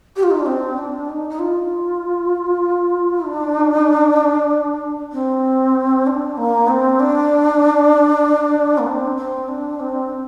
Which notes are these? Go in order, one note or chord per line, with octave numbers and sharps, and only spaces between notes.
G4
F4
D#4
D4
C4
D4
D#4
D#4
F4
D4
C4
D4
A#3
C4
D4
A#3
C4
C4
D4
C4